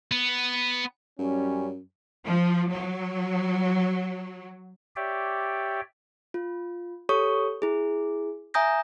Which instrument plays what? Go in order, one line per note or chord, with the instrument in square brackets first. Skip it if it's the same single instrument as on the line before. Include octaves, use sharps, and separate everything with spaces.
[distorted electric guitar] B3
[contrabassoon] F#2 [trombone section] G3 C#4
[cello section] F3
F#3
[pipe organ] G4 C#5 D5 E5 G5
[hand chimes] F4
G4 A4 C#5 C#6 D#6
E4 G#4
E5 G#5 A#5 D#6 G6 A#6